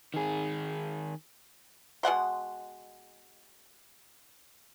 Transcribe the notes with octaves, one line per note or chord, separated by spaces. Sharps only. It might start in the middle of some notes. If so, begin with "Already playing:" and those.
D#3 G#4
B2 G#3 F#5 C6